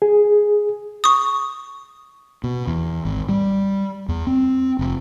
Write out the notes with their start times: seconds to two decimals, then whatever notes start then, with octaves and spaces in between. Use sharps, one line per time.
0.02 G#4
1.04 C#6 D#6
2.44 B2
2.67 E2
3.05 G#1
3.29 G3
4.09 E2
4.27 C4
4.79 F1